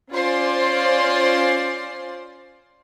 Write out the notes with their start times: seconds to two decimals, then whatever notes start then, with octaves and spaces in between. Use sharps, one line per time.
0.12 C#4 F4 C5 D5 C6